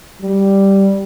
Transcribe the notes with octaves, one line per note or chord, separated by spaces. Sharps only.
G3